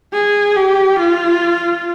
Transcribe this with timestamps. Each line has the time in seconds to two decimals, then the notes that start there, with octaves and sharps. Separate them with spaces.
0.13 G#4
0.56 G4
0.99 F4